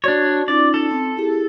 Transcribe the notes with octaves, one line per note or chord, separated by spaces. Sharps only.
D4 F#4 C#5 D5
C#4 D#4 F4 D5
A4
C4
E4 G4 G#4